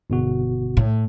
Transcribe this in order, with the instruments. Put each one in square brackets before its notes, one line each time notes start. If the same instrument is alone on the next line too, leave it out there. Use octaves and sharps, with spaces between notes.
[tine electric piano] G1 B2 F#4
[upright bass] A2